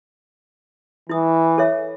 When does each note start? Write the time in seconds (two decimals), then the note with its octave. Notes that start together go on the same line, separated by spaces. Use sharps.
1.09 E3 E4 D#6
1.58 A4 C#5 E5